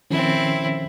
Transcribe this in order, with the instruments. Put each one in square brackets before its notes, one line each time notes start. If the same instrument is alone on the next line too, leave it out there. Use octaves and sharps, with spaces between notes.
[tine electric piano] D#3 F3 C#4 [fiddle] C4 E4